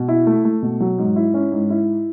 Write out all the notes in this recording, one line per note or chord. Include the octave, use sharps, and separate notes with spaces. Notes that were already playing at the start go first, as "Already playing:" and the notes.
Already playing: B2
E4
A3
A3
B2
F#3
G#2
E4
C#4
G#2
E4